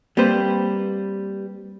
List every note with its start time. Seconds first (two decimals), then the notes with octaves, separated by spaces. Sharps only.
0.17 G3 A#3 C4 B4 C5